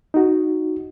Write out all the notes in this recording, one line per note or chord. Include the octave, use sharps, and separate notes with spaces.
D#4 F#4